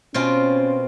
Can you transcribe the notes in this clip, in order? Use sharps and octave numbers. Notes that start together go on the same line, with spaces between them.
B2 C4 C#4 F4